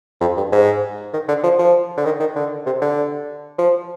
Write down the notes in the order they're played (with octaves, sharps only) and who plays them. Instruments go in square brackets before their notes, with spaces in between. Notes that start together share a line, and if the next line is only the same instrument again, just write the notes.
[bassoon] F2
G2
G#2
D#3
D3
F3
F3
D3
D#3
D#3
D3
C3
D3
F3